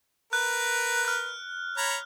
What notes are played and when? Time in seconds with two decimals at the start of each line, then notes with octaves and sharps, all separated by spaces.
0.33 A#4 B4 F#6
1.05 F6 F#6
1.78 C#5 A#5 B5